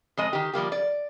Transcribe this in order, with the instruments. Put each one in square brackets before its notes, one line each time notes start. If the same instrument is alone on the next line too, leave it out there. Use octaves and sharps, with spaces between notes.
[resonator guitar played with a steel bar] F2 G#3 D#5
D#3 G4
F3 G3 A#3 G4
D5